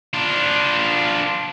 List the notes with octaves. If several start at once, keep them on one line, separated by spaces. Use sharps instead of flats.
D4 F4